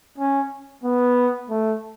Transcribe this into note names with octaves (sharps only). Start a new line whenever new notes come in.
C#4
B3
A3